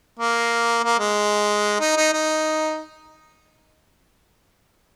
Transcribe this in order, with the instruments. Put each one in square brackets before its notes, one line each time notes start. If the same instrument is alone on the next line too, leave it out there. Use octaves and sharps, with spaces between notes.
[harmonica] A#3
A#3
G#3
D#4
D#4
D#4